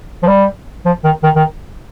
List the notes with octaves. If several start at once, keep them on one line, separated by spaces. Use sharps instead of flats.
F3
G3
F3
D#3
D#3
D#3